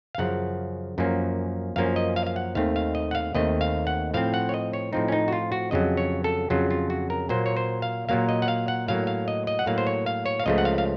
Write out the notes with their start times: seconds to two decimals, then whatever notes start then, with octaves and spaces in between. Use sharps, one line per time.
0.15 F5
0.18 F#2 C#3 F3 F#5
0.98 F#2 F3 A#3 C#4
1.76 F#2 F3 A#3 C#4 F5
1.96 D#5
2.16 F5
2.27 F5
2.36 F#5
2.55 D#2 D#3 A3 C4 F5
2.76 F5
2.95 D#5
3.11 F#5
3.15 F5
3.35 D#2 D#3 A3 C4 D#5
3.61 F5
3.87 F#5
4.14 A2 F3 C4 F5
4.34 F#5
4.49 C#5
4.54 D#5
4.73 C#5
4.93 A2 F3 C4 D#4
5.08 C#4
5.12 D#4
5.28 F#4
5.33 F4
5.52 F#4
5.71 F2 C#3 F#3 D#5
5.97 C#5
6.24 A4
6.50 F2 C#3 F#3 F4
6.71 F4
6.90 F#4
7.10 A#4
7.29 A#2 F#3 A#3 C5
7.46 C#5
7.57 C5
7.82 F5
8.09 A#2 F#3 A#3 F5
8.29 D#5
8.42 F#5
8.48 F5
8.68 F#5
8.88 A2 F#3 A#3 F5
9.07 F5
9.28 D#5
9.47 D#5
9.59 F#5
9.66 A2 F#3 A#3 F5
9.78 C5
9.87 C#5
10.06 F5
10.26 C#5
10.40 F5
10.46 C#2 C#3 F3 A3 D#5
10.58 F#5
10.65 F5
10.78 F5